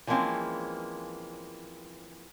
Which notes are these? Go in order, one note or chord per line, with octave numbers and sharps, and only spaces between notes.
E3 F3 G#3 A#3 C4 C#4